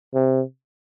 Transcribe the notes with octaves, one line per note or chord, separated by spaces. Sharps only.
C3